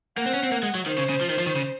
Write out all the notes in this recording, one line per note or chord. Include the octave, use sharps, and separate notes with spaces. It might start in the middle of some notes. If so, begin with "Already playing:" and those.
A#3 F#5
C4
C#4
C4
A#3
G#3
F#3
D#3 C5
C#3
C#3
F3
D#3
F3
D#3
C#3